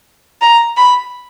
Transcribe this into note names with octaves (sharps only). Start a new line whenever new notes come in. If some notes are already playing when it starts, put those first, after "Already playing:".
A#5
B5